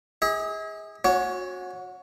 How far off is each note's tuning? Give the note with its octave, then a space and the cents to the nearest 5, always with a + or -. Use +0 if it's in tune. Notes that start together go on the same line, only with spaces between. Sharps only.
G#4 -25 D#5 +45
C#4 -30 F#4 -20 C#5 +20